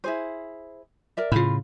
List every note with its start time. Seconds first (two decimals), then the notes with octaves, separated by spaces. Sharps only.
0.04 E4 G#4 C5
1.17 A#4 D5 E5
1.32 A2 C#3 F4 F5 B5